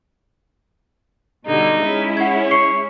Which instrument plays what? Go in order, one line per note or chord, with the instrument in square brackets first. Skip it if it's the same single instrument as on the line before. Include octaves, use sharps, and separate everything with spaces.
[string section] B2 D3 G3 [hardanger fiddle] D#4
[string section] G#3 C#4 E4
[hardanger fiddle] C#5 [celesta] F#5 G#6
[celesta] C#6 C7 C#7